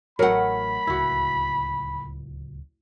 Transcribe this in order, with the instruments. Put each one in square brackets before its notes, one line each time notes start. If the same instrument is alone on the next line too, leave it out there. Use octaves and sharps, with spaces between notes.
[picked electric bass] A1 [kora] F#3 A3 [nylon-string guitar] A#4 F#5 [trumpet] B5
[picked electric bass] D1 C#2 [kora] E4 F#4